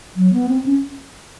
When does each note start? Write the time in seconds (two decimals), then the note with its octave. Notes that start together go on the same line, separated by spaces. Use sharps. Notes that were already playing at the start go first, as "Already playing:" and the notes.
0.16 F#3
0.33 B3
0.49 C4
0.66 C#4